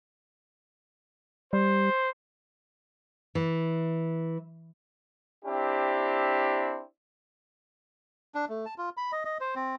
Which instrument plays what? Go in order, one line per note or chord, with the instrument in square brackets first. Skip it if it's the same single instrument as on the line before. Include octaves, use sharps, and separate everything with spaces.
[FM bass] G3 [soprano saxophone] C5
[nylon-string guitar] E3
[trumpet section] C4 D4 E4 G4
[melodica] D4
A3
A5
F4
B5
D#5
D#5
C5
C4